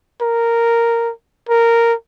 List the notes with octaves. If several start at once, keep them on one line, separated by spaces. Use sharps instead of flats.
A#4
A#4